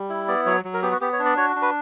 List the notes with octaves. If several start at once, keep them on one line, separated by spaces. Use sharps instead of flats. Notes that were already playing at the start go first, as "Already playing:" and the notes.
Already playing: G3
E4
B3 D5
F#3 C#5
F#3
A#4
B3 G4
F#4
B3 G4
C#5
D4
D5
F#4 C#5
D4
B4